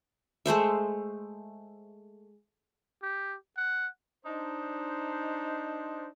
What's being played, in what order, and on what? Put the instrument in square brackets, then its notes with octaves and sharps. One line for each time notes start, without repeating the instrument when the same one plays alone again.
[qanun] G#3 A3 C5 E5
[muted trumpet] G4
F#5
[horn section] D4 D#4 C5